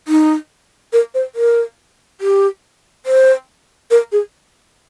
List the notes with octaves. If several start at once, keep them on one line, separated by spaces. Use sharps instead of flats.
D#4
A#4
C5
A#4
G4
C5
A#4
G#4